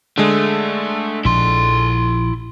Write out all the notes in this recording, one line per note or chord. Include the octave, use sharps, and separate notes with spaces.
D3 G#3 A3
A#1 F3 E4 C6